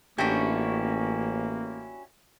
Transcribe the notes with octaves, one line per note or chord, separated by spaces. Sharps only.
A1 A#3 C#4 D4 E4 F#4 G4